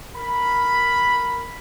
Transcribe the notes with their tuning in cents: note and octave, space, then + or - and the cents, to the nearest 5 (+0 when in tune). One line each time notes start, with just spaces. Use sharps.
A#4 +0 B5 +0